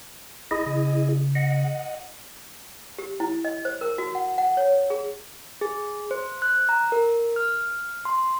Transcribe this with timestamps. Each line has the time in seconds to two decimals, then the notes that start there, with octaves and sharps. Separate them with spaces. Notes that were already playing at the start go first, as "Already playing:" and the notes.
0.51 G#1 E4 G#4 D#5
0.66 C#3
1.35 D#5 F#5
2.98 G4
3.20 E4
3.45 D#5
3.65 C5
3.81 A#4
3.98 F#4
4.15 F#5
4.38 F#5
4.57 C#5
4.90 G#4
5.61 G#4
6.11 C5
6.42 F#6
6.69 A#5
6.92 A#4
7.36 F6
8.05 C6